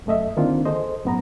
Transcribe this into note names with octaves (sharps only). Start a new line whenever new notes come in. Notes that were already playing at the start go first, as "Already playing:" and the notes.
C2 F#2 A3 D#5 E5
D3 D#3 A#3 C4 D4 F4
G#4 A4 C5 D#5
F#2 A2 B3 B4 A#5